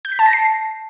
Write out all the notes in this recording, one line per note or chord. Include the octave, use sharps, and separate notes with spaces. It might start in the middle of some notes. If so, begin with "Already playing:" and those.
G6
B6
A5
A#6
C7